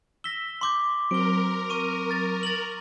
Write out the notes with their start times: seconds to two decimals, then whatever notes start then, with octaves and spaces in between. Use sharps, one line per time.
0.24 E6 A#6 B6 G7
0.61 C6 D6 G6
1.11 F#3 C4 A#4 D7 G7
1.70 C#6 D#7
2.11 A6
2.43 A6 F7 F#7